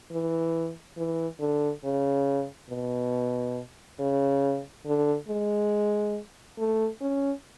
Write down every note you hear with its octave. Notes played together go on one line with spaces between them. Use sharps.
E3
E3
D3
C#3
B2
C#3
D3
G#3
A3
C#4